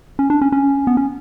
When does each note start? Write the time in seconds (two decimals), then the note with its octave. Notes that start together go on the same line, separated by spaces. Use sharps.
0.19 C#4
0.30 D4
0.41 C#4
0.52 C#4
0.87 B3
0.97 C#4